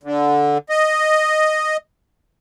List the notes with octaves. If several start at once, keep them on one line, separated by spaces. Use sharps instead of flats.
D3
D#5